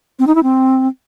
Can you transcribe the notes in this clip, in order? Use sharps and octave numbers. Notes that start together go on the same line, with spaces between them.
C4
D#4
E4
C4